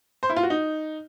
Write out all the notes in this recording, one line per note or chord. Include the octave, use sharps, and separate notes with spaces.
C5
E4
F4
F#4
D#4